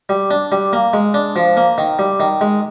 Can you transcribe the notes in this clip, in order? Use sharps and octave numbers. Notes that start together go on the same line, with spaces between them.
G3
D4
G3
A#3
G#3
D4
F3
A#3
D#3
G3
D#3
G#3